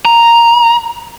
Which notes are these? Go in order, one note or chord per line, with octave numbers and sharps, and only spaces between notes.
A#5